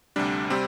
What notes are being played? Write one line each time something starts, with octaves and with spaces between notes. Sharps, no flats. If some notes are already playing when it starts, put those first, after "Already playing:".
D2 C3 G3 D4
C3 G3 C4